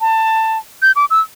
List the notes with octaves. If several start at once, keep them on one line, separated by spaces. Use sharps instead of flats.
A5
G6
D6
E6